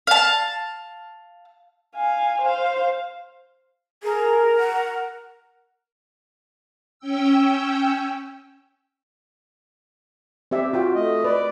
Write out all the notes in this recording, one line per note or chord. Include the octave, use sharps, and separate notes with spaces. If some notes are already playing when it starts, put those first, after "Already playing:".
F5 A5
F5 G#5
C5 F5
G#4 A#4
F#5
C#4 G5 E6
C4 G4 E5
F4 F#4 G5
A3 D#5
B4 D5